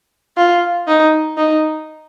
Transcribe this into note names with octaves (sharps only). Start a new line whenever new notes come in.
F4
D#4
D#4